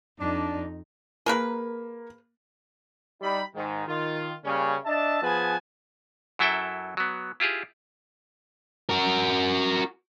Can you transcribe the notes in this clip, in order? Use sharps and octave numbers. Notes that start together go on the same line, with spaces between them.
F2 D4 D#4
A#3 G#4 A#4 B4
G3 D#4 B5
G#2 D#3
D#3 F4
C#3 G3 A#3 C#4
D4 D#5 E5 A5
F3 B3 G#4 B4 G#5 A5
F#2 F#3 E4 A4 E5 G5
F#3 B3
E4 F4 G4 G#4
F#4 A#4